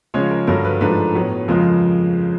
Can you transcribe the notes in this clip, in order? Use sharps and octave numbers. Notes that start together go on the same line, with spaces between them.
C#3 F3 G#3 C#4 C#5
A#4
G2 D3 F#3 A#4
B4
G#2 F3 A3 D4 B4
A2 F#3 B3
F2 C#3 F3 G#3 A#4